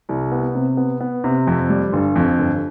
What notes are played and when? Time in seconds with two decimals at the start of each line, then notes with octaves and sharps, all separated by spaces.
0.09 C2
0.32 B3
0.55 C3
0.77 B3
1.00 B3
1.24 C3
1.47 F2
1.70 G3
1.93 G1
2.16 F2
2.39 G1